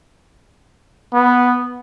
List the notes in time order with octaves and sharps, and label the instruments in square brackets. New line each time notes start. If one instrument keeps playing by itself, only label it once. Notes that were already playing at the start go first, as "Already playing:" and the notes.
[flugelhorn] B3